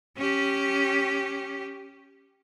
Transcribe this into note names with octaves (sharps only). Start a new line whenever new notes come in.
C#4 G4